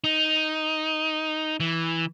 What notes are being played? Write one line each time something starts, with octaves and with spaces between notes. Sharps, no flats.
D#4
E3